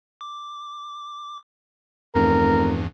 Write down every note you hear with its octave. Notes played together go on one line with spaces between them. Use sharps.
D6
F1 E2 G2 E3 A#4